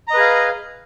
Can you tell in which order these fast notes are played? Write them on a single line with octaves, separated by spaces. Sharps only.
A#5 D#5 B4 G#4 F5